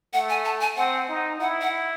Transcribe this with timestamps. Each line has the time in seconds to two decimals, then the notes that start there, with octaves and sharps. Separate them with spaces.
0.13 A3 F#5
0.29 G#5
0.45 A5
0.61 G#5
0.77 C4 F#5
1.09 D#4
1.40 E4 F#5
1.61 F#5